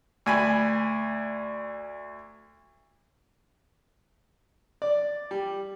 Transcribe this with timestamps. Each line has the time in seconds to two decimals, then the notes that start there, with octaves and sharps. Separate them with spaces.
0.26 D2 G#5 B5
4.82 D5
5.31 G3